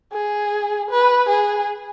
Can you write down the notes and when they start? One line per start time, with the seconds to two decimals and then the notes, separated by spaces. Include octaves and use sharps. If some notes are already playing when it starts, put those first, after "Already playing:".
0.13 G#4
0.90 B4
1.28 G#4